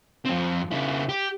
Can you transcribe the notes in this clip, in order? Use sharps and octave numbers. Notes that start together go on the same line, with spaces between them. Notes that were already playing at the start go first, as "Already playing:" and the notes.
F2 C4
C#3 E4
G4